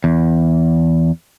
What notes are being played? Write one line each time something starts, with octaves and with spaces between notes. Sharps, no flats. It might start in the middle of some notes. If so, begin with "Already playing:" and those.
E2